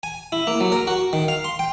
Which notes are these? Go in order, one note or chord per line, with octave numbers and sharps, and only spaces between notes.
G#5
E4
A#3
F#3
A#4
F#4
D#3
F5
C6
G5